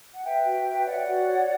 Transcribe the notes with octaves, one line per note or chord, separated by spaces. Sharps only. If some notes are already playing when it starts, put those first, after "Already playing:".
F#5
B4 E5 G5
F#4
B4
C#5 D5 F#5
F#4
C#5